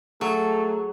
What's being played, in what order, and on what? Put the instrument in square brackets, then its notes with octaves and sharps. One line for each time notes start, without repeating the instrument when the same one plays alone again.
[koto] F#3 [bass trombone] A3 [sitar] G#4 [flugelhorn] A4